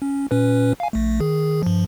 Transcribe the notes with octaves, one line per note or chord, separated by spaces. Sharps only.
C#4
A#2 C#4 B4
F5 G#5
A#1 A3
D#3 G#4
G2 F3